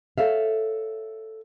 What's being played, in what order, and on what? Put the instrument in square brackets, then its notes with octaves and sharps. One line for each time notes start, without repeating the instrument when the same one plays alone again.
[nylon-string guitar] A4 C#5 E5 F5